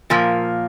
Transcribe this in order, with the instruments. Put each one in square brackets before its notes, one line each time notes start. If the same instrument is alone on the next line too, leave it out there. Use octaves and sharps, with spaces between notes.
[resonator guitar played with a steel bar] A#2 F3 A#3